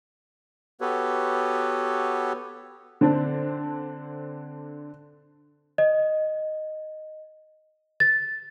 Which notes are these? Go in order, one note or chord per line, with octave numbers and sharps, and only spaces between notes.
B3 F#4 G4 A4 B4 C#5
D3 C4 D4
D#5
A6